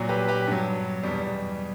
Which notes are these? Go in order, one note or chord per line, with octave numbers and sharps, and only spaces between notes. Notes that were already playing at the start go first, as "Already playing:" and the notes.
Already playing: A#2 F#3
G4 B4
G4 B4
G2 F#3
E2 B2 G3